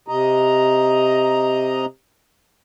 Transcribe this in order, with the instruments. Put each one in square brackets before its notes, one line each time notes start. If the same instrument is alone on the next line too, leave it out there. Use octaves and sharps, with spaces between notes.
[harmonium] C3 D#5 A#5